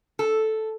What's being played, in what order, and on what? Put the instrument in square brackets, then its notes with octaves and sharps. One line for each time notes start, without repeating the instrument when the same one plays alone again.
[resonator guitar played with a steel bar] A4